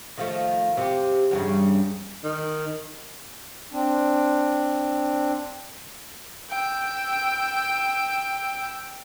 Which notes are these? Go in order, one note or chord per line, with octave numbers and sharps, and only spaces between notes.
D#3 F3 A3
C3 G4
E2 G2 C#3
D#3
C4 D4
G5 E6